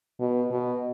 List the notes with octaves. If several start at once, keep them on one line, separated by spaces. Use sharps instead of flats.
B2
B2